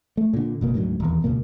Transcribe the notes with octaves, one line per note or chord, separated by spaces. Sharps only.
A3
A#2 D3
F#1 B2 A#3
D2 G#2 F3 F#3
D#1 E2
C#2 G#2 B2 A#3